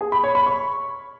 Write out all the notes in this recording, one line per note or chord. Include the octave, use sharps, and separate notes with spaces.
G#4
B5
C#5
B5
C#6